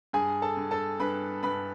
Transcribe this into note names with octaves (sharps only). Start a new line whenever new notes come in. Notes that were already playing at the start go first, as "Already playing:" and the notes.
G2 G#4 G#5
A4 A5
G2
A4 A5
G2 B4 B5
G2 B4 B5